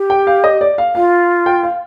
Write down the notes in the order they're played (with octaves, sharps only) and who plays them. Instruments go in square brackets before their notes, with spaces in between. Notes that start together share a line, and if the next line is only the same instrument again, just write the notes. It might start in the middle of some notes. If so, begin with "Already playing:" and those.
Already playing: [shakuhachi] G4
[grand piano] G5
F5
D#5
D5
F5
[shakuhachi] F4 [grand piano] F5
[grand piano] G5
F5